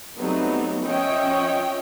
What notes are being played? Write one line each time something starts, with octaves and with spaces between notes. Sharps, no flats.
F#3 G3 A3 B3 C4 D#4
F3 C#4 C#5 D#5 E5 G5